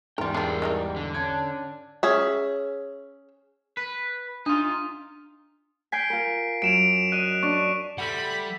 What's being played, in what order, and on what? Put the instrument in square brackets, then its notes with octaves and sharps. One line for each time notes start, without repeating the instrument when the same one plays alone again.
[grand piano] E2 G#2 [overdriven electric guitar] G3 G5 [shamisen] F4 A#4
[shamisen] D4 F4 [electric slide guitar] G#4 A#4
[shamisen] D#3 E3 D#4
[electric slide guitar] D3
[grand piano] C#4 G#6 [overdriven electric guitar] D4
[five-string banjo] C#4 G#4 E5
[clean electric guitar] B4
[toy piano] D4 [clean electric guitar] D#4 F4
[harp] G#5 G6 [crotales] B6 C7 D7
[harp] F4 A#4
[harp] F#2 [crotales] D7 E7 F7
[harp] D#5 [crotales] F#6 D#7
[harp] D4 [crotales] C#6
[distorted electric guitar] G3 [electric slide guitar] A4 E5 F#5 [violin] B5 B6